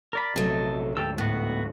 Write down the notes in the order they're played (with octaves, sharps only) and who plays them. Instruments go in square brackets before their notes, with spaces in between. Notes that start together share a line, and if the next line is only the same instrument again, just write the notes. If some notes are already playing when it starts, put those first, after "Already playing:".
[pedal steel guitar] A#4 D5 B5
[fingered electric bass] A#1 C3 [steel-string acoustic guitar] F#3 A3 [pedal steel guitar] A4 D#5
[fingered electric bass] D2 G#2 [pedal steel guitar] G4 A4 E6
[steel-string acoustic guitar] A2 [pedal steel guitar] B3 F#4